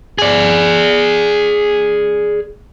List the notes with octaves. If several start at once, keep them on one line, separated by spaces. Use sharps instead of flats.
G#4 D5